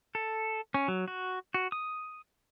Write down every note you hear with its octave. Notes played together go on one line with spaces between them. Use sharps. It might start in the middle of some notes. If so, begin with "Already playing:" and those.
A4
C#4
F#3
F#4
F#4
D#6